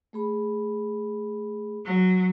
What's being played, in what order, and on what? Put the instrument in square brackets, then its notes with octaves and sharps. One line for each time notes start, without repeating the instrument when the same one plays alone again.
[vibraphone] A3 G#4 B5
[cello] F#3